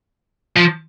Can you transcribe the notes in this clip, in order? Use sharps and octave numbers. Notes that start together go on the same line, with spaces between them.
F3